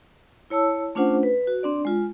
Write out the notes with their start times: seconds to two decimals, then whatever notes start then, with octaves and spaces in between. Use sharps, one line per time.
0.50 E4 C#5 A5 E6
0.95 A3 C#4 D4 F4 C5 F#5
1.23 B4
1.47 F#4
1.63 C4 D4 D5
1.85 G#3 F4